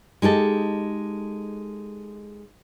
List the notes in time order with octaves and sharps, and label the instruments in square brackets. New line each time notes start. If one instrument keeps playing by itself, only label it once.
[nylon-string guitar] G#3 D#4 G4 A4